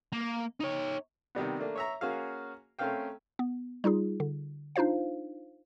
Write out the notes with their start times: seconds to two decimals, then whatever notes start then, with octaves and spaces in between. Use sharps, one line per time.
0.12 A#3
0.60 D#4 C#5
1.35 C3 D#3 G3 B3
1.59 A3 A#3 D4
1.75 C#5 E5 A#5
2.01 A#3 C#4 F#4 G#4 F5
2.79 A3 C4 C#4 A#4 F5 G5
3.39 B3
3.84 G3 D#4 F4 G#4
4.20 D3
4.76 D4 D#4 F4 C5 F5